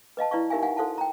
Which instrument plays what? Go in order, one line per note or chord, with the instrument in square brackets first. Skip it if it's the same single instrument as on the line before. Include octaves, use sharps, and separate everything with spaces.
[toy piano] B4 D#5 F5 A5
E4 B4 D5 F5 C#6
D#4 G4 A#4 E5 F5 G#5
D#4 F5 F#5 G#5
F#4 A4 C5 F5 F#5 A5
G5 A#5